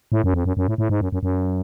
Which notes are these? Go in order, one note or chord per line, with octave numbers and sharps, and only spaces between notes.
A2
F#2
F2
F#2
F#2
A2
A2
G#2
F#2
F#2
F#2